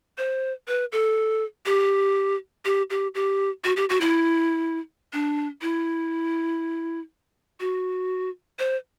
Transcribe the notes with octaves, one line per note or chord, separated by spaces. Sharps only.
C5
B4
A4
G4
G4
G4
G4
F#4
G4
F#4
E4
D4
E4
F#4
C5